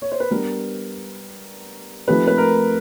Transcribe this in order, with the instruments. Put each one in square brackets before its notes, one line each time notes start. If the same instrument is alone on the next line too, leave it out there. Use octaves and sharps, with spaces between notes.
[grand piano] C#5
C5
B4
[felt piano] G3 B3 D4 [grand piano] A#4
[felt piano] F3 A3 C4 D#4 G4 [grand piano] B4
[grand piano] B4
A#4